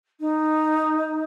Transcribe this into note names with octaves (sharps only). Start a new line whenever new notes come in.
D#4